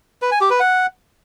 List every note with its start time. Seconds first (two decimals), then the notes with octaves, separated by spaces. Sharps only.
0.22 B4
0.31 G#5
0.41 G4
0.50 B4
0.60 F#5